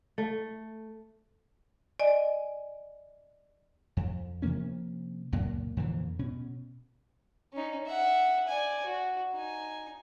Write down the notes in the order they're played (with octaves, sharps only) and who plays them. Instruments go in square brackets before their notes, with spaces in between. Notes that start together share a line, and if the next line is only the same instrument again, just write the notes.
[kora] A3
[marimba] D5 D#5 G#5
[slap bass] F2
C3 F3 A#3 C#4
C#2 F#2 A#2 A#3
F2 A#2 D3 E3
B2 C#4
[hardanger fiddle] C#4 D#4
E5 F#5
D5 G#5
F#4
D#4 G#5